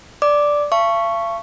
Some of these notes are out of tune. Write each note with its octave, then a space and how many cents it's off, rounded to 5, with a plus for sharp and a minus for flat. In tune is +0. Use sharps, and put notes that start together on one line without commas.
D5 +0 D6 +0
F5 -45 A5 +0 C#6 +0